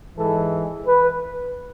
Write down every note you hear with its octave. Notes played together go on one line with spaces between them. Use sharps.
G#2 E3 G#3 A4
B4